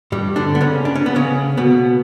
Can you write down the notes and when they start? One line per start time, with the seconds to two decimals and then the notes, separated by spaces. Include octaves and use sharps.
0.12 G2 G3
0.36 D3 D4
0.55 B3
0.61 C#3 C#4
0.85 D4
0.95 C#4
1.06 B3
1.16 C#3 C#4
1.57 B2 B3